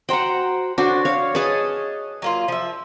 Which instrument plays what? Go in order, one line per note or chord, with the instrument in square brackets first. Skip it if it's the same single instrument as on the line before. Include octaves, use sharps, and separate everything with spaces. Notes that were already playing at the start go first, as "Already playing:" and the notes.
[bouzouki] F#4 C5 A#5 [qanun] F#5 G5
[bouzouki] D3 [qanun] D4 F#4 C5
[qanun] C#5 F5
[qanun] G#4 A5 [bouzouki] B4 C#5 D#5
[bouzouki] F#3 A#3 F4
F3 E5